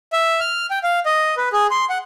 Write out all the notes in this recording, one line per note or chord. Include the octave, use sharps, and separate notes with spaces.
E5
F6
G5
F5
D#5
B4
G#4
C6
F#5